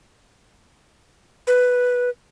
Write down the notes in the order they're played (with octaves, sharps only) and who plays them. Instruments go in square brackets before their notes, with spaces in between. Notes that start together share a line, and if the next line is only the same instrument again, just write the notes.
[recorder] B4